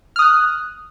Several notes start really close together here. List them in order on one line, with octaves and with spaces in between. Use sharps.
F6 D#6 F#6